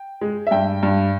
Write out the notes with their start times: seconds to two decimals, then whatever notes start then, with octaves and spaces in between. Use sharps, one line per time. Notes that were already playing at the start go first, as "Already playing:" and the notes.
Already playing: G5
0.21 G#3
0.47 E5
0.51 G2 G5
0.83 G2